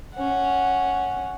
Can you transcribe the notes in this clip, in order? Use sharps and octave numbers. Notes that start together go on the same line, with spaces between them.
C#4 F#5